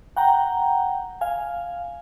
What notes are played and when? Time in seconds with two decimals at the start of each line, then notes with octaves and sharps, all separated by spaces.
0.17 F#5 G5 A#5
1.21 F5 G#5